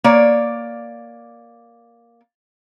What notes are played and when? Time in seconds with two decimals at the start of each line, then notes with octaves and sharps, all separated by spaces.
0.04 A#3 C#5 D5